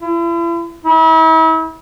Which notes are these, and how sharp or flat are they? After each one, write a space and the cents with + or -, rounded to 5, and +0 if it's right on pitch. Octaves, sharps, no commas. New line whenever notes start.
E4 +40
E4 -40